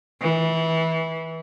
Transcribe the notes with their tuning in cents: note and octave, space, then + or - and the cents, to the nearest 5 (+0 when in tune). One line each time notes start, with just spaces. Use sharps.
E3 -20